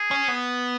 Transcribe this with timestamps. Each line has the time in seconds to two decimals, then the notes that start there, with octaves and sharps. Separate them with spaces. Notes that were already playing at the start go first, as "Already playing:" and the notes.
Already playing: G#4
0.11 C#4
0.28 B3